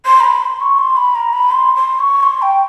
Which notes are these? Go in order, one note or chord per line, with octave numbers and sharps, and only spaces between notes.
C6
A#5
B5
C6
C#6
C6
B5
A#5
B5
C6
C6
C#6
C6
G5